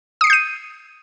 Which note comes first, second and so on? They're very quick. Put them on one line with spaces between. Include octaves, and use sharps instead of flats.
D#6 C7 C#7 G6 D#7